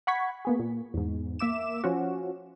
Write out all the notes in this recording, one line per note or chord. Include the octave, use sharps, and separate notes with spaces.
F#5 B5 C#6 G#6 B6
A#3 B3 G#4
A#2
E2 G#2
A#3 E5 D6 E7
F3 C#4 F#4